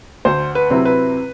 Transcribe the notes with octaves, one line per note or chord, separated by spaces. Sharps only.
D2 C5
B4
C3 F#3 C4 E4
B4